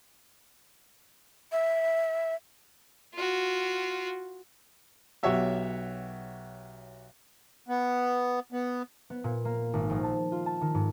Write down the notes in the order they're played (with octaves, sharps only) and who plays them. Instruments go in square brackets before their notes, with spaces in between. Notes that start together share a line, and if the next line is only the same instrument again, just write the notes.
[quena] E5
[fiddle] F4 F#4
[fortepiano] B1 F#4 G4 C#5 E5 E6
[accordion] B3
B3
[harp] B3
A#2
A#3
G#1
A#1
A5
F4
A5
D#3
G#2